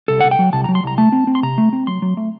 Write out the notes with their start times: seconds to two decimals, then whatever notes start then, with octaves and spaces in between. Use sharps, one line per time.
0.08 C2 A4
0.21 C2 F#5
0.31 G5
0.39 F#3
0.53 C2 A5
0.64 F#3 A#5
0.75 C6
0.84 C2 A#5
0.98 A3 A5
1.12 C4
1.27 C4
1.35 C6
1.43 C3 A#5
1.58 A3
1.73 C4
1.87 F#3 C6
2.02 F#3
2.17 A3